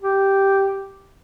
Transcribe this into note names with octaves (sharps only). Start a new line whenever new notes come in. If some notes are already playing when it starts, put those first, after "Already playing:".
G4